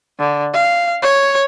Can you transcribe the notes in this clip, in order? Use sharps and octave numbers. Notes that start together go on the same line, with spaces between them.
D3
F5
C#5